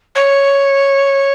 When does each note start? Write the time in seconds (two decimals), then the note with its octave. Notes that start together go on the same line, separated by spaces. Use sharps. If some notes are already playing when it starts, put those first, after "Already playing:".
0.15 C#5